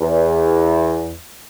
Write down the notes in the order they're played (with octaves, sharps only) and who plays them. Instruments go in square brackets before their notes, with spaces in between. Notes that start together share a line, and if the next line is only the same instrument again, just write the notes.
[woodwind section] E2